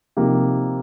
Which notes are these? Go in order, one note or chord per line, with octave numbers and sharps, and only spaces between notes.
C3 F3 A#3 D#4